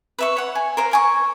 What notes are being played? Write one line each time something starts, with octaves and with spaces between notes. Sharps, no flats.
B4 E5 C#6
C#5 F#5
G#5
A#4 C5 F5
A#4 G#5 C#6